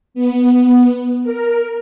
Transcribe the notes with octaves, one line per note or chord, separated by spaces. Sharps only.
B3
A#4